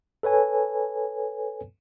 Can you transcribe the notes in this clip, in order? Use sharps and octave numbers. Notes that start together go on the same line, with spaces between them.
A4 B4 C#5 G#5